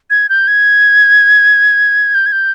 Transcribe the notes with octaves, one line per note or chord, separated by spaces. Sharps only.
G#6
G6
G#6
G6
G#6
G6